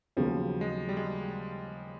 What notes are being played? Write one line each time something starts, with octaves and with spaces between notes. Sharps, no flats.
D#2 C#3 F3 F#3 B3
G#3
G3
G#3